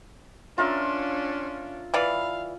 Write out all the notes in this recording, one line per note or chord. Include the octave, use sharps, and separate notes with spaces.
C#4 D4 F4 A#4 E5
E3 D5 F5 B5